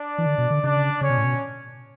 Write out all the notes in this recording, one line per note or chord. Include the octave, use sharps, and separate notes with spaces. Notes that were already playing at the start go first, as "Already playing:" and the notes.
Already playing: D4 D5
E3
D3
B2
D3
C#3 D4 D5
C#3 C#4 C#5
B2
A2
B2